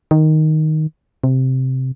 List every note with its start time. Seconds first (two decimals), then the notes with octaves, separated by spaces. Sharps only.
0.11 D#3
1.24 C3